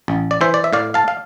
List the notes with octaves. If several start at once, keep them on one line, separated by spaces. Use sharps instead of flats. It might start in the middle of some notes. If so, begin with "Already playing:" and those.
A1
D5
E3 C5 E5
D5
E5
A2 D5 F5
F5 A5
F5